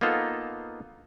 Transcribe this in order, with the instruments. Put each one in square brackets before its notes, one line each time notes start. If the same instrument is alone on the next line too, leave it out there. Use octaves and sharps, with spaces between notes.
[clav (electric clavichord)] A#3 B3 D#4 F4 A4